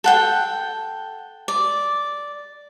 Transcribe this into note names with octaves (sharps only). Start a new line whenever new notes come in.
A4 F#5 G5
D5